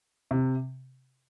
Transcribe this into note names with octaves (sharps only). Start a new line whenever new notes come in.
C3